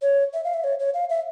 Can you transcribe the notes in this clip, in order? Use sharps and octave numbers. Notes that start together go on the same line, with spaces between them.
C#5
E5
F5
E5
C#5
C#5
F5
E5